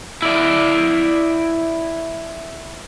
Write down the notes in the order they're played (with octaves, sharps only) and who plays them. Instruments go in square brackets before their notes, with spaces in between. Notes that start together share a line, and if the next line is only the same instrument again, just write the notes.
[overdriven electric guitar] E4 D5